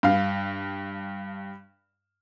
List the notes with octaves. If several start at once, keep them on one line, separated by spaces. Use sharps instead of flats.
G2 F5